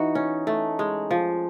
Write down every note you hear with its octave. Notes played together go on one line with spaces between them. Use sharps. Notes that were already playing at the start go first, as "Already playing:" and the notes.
Already playing: E3 D#4 F#4
C#4
A3
G#3
F3